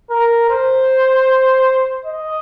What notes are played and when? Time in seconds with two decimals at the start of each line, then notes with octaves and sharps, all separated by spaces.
0.10 A#4
0.50 C5
2.05 D#5